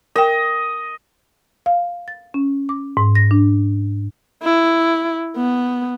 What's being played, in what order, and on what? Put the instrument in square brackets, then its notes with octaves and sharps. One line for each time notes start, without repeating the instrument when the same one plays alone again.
[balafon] A#4 G5 [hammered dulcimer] D#5
[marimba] F5
A6
C#4
D6
G#2
A#6
D4
[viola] E4
B3